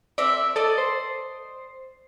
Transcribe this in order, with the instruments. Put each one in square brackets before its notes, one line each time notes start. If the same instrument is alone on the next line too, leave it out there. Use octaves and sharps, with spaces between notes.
[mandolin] C4 A4 E5 [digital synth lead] D5
[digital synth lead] A4 [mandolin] D5 D#5
[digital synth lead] C5